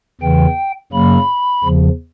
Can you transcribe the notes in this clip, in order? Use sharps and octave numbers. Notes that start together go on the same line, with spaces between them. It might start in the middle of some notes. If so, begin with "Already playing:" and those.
E2 C#3 E3 G5
F#2 C#3 F#3 A#3 B5
E2 C#3 F3